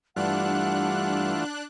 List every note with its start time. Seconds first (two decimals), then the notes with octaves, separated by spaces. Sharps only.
0.16 G2 E3 A3 D4 F4 F#5 F#6